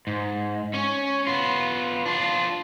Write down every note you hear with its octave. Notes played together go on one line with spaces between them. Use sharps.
G#2
C#4 C#5
B3 F4
D4 F4